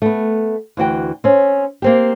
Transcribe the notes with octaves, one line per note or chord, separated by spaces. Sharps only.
A3 B3
D2 E3 F#4 G5
C4 C#4
A#3 C4 G4